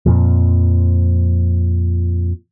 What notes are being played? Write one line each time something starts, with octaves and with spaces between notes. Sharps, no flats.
F2 A#2 F3